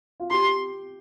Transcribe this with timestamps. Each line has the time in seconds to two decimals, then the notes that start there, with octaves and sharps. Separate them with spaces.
0.20 F4
0.31 G4 C6